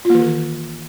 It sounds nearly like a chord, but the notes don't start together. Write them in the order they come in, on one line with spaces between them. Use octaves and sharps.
F4 A#3 E3 D#3